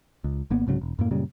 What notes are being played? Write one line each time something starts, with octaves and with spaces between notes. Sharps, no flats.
C#2
G#1 A#3 B3
C2 G#2 C#3 F#3
E1
F#2 A2 A#3
F#2 A#2 C#3 G3